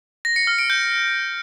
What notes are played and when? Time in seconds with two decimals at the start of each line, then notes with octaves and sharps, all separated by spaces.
0.25 A#6
0.36 C#7
0.47 F6
0.59 D7
0.70 G6